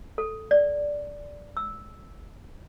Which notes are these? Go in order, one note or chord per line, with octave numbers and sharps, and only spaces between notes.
A4
D5
E6